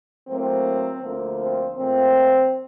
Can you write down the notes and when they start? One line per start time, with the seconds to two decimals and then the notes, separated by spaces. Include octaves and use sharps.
0.26 A2 F#3 A#3 C4
1.01 D2 D3 F3 A#3
1.39 C4
1.76 A#2 F3 A3 C4